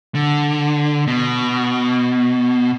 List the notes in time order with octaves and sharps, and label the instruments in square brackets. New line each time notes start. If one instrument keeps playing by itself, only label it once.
[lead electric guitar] D3
B2